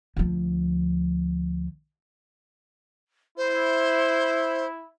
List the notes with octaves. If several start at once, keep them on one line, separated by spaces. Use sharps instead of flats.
D2 F3
E4 C5